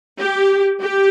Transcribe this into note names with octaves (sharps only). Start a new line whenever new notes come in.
G4
G4